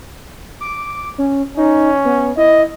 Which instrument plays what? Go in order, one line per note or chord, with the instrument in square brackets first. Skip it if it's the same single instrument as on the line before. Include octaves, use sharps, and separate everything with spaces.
[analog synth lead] D6
C#4
[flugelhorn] C#4 [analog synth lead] D#4
[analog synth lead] B3
[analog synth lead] E4 [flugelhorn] D#5